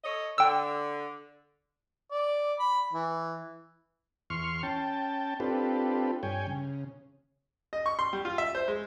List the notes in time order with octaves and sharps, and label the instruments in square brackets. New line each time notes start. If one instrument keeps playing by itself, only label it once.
[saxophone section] A4 C#5 D#5
[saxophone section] D3 [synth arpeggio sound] G5 E6
[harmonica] D5
B5
E3
[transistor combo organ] E2 C6 C#6 F6
C#4 G5 A5
C4 D4 F4 G4 A4 B4
G2 C#5 G5 G#5
C#3
[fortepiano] D#5
C#6
C6
G3
F4
E5
C5
G#3